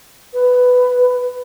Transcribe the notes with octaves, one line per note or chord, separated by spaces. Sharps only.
B4